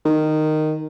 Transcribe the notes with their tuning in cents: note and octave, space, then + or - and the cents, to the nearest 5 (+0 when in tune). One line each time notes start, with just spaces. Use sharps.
D#3 -10